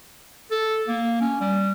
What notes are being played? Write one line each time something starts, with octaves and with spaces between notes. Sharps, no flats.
A4
A#3
C#4
G3